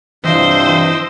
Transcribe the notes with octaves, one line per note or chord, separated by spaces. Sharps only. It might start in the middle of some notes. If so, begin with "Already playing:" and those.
G2 C3 E3 F3 C5 D#5 G5 E6